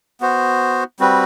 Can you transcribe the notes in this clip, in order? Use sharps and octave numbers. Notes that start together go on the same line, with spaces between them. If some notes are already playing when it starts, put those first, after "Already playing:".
B3 F#4 C5
G3 C4 F#4 B4